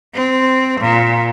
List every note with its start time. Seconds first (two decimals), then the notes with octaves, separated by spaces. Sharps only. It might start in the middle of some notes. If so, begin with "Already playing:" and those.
0.14 C4
0.80 A#2